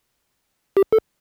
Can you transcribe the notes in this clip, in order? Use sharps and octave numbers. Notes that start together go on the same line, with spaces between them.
G4
A4